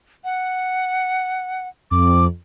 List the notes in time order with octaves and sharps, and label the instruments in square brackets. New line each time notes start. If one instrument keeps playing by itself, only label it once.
[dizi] F#5
[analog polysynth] F2 [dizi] D6